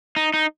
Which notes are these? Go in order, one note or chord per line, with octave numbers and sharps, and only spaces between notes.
D#4
D#4